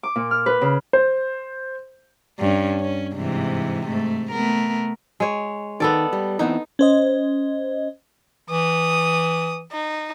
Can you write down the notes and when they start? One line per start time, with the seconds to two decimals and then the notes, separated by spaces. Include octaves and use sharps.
0.03 D6
0.16 A#2
0.31 F6
0.46 B4
0.61 C#3
0.93 C5
2.39 G2 C#4
2.80 C#4
3.15 G#2 C3 E3
3.87 G#2 A3
4.32 A3 B3 A#4
5.20 G#3 C#5
5.80 D#3 B3 A4 D5
6.13 G3
6.39 E3 B3 C4 D#4
6.79 C#4 C5 D#5
8.50 E3 D#6
9.71 D#4